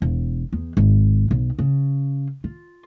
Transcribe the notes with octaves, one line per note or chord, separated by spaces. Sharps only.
E1
E2
G#1
B1
C#3
F4